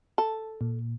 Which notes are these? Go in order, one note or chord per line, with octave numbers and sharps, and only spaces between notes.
A4
A#2